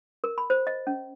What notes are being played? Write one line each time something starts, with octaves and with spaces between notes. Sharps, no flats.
A#4
B5
C5
D#5
C#4